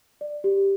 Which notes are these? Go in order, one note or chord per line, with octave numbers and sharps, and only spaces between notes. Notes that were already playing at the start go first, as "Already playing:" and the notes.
D5
G4